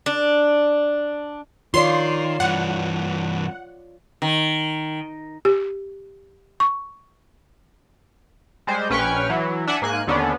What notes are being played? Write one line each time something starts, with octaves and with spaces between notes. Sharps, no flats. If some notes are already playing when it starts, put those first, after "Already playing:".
D4
D#3 F4 C#5 D5 C6 C7
G2 E3 F#5
D#3
G4
C#6
G3 G#3 C5
A#1 C#4 B4 G5 C#6 F6
E3 F#3
D4 E5 F#5 G#5
G#2 A#3 G#5 F#6
D#2 D3 B3 C#4 D4